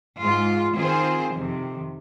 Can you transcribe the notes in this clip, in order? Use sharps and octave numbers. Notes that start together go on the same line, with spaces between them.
G#2 G#3 F4
D#3 C4 F4 G#4 C5
F2 C3 D#3